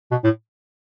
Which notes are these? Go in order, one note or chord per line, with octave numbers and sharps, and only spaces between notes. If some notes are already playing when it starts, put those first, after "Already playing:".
B2
A2